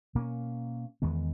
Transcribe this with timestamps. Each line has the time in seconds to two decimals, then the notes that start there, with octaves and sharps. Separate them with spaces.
0.15 B2 A#3 C#4
1.02 E2 D#3 G#3 B3